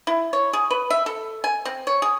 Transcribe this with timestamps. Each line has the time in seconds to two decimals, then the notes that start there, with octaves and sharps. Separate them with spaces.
0.07 E4
0.33 C#5
0.53 G#4
0.71 B4
0.90 E5
1.06 A4
1.44 G#5
1.65 C4
1.87 C#5
2.02 G#4